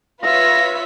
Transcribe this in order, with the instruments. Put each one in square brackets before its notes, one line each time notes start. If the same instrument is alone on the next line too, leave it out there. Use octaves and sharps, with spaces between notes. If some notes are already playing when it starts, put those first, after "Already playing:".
[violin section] F4 B4 C#5 [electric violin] E5 B6 [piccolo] A#6